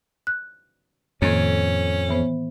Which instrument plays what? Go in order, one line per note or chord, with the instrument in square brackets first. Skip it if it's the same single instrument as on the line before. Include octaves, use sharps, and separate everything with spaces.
[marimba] F#6
[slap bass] F2 [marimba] A2 D#3 A#3 [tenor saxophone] C#4
[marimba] E3 B3 C5